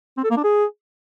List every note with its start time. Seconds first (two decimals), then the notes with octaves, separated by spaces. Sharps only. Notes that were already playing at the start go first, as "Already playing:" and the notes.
0.17 C4
0.24 A4
0.31 A#3
0.37 D4
0.44 G#4